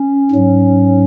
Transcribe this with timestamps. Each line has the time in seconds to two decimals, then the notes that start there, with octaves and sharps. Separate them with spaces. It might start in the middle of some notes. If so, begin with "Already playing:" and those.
Already playing: C#4
0.31 G#2 F#3